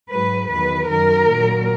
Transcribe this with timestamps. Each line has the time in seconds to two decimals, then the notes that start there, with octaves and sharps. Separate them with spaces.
0.11 G#2 F#3 B4
0.50 E2 D#3 F#3 B4
0.89 F#2 D#3 F#3 A#4
1.29 A#2 F#3